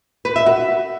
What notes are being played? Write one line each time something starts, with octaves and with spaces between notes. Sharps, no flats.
B4
E5
F#4